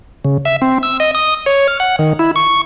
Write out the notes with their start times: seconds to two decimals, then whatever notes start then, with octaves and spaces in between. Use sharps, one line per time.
0.25 C#3
0.45 E5
0.62 C4
0.83 E6
1.00 D#5
1.15 D#6
1.46 C#5
1.68 F6
1.80 F#5
1.99 D#3
2.19 E4
2.36 C#6